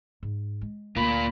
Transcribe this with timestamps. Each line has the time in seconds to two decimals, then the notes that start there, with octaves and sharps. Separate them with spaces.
0.23 G#2
0.61 G#3
0.96 D2 A#3 F4 B5